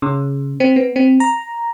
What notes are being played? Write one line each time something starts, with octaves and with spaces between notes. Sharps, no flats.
C#3
C4
B3
C4
A#5